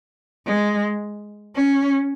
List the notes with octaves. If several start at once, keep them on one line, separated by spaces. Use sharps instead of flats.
G#3
C#4